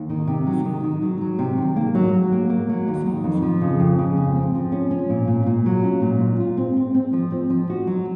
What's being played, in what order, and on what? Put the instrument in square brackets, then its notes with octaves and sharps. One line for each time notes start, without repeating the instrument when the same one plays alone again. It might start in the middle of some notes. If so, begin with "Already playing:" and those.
Already playing: [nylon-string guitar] D#2
D#3
C3
F#3
D#3
D#3
F#3
F#3
C3
D#3
A#3
F#3
F#3
A#3
A#3
F#3
D#2
D#3
F2
F3
C#3
F2
C#3
C4
C4
F3
C#4
C#4
A#2
A#2
A#2
F#3
C#4
A#2
F4
F4
C4
C4
C4
F3
C4
F3
F#4
F#3